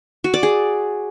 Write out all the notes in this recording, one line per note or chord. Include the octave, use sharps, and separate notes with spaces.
F#4
D5
G#4